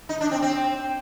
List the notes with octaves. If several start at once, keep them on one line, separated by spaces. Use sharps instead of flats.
D#4
D4
C4
C4